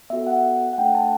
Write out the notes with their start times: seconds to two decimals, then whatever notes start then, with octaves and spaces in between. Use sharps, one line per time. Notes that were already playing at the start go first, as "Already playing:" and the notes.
0.10 B3 F#4 A4 E5
0.27 F#5
0.73 F#5
0.78 A3 D4 A4 G5
0.95 A5